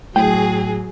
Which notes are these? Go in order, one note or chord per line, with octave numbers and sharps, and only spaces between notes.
A2 F#3 G#4 G5